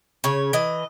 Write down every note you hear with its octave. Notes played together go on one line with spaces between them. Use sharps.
C#3 C#5
E3 D#5